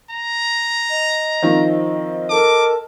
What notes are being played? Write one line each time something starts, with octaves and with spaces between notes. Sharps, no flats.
A#5
D#5
D#3 F3 C4
A4 A#4 A5 D6